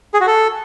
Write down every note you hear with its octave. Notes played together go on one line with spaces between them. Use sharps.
G#4
F#4
A4